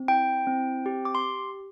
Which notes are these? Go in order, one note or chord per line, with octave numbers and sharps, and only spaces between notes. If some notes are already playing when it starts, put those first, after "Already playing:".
Already playing: C4
E4 G5
C4
G4
D6
C6